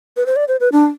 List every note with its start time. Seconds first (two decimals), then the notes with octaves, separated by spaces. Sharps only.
0.17 B4
0.26 C5
0.36 D5
0.48 C5
0.60 B4
0.72 D4